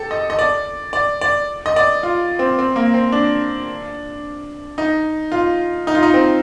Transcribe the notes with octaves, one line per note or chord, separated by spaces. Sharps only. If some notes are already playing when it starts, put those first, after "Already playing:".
Already playing: G4 A4
D#5
D#5
D5
D5
D5
D#5
D5
F4
C4
C4
A#3
C4
D4
D#4
F4
D#4
F4
D#4
C4